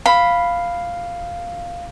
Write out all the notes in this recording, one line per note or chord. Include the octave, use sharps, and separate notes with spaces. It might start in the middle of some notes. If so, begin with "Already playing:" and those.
F5 B5